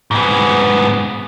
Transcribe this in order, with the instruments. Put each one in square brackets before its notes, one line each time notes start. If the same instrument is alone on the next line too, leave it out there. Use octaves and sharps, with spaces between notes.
[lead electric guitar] G#2 B3